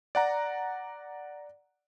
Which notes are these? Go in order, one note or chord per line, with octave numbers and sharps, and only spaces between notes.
D5 F#5 A#5